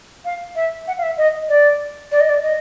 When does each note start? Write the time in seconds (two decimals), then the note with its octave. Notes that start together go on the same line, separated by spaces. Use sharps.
0.25 F5
0.56 E5
0.87 F#5
0.98 F5
1.03 E5
1.18 D#5
1.49 D5
2.12 D5
2.20 D#5
2.29 D5
2.42 D#5